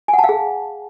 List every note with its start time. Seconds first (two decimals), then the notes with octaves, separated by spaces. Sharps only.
0.08 G#5
0.13 F#5
0.19 A5
0.24 F5
0.29 G#4